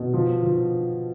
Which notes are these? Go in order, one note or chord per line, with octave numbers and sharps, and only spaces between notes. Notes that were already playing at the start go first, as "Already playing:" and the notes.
Already playing: B2
F3
F3